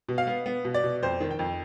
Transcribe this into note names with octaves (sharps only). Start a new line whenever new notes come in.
B2
F5
B3
B3
B2
D5
B2
F2 C5
D#3
G5
F2